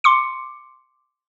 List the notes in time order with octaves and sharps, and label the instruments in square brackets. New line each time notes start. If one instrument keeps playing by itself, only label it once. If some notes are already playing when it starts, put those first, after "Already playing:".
[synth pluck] C6 D6 C#7